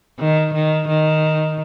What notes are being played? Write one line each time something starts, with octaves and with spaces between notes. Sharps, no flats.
D#3
D#3
D#3